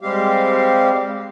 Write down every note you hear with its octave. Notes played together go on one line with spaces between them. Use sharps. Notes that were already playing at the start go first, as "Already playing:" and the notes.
G3 G#3 C4 G4 F5